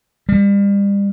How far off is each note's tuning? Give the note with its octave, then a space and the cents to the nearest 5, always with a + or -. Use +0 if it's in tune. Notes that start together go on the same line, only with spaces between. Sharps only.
G3 +35